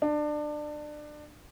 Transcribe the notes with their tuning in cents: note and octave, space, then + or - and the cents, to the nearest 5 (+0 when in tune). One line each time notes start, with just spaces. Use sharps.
D4 +25